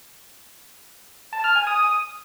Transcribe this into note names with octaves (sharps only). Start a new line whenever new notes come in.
A5
F6
G#5
D#6